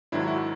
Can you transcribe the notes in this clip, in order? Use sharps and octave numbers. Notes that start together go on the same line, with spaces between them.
G#2 D#3 F#3 D4 E4
E4 F#4